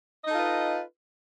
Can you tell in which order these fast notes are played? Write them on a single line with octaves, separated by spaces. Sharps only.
D#5 D#4 A4 F4 B4